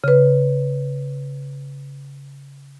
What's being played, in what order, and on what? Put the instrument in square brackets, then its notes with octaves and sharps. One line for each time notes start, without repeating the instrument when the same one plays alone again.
[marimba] C#3 B4